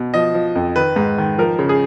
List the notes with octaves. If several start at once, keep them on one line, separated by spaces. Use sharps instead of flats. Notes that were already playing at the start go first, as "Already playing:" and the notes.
Already playing: B2
F3 D#5
F3
F2
D#3 B4
G#2
D#3
F3 A#4
C#3
G#4